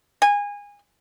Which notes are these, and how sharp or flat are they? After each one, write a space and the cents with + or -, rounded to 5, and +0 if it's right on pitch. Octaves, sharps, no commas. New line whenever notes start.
G#5 -25